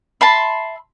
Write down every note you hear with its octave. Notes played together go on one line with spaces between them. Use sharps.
E5 A5 B5 C6